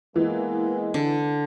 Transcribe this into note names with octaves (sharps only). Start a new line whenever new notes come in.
E3 G#3 A#3 B3
D3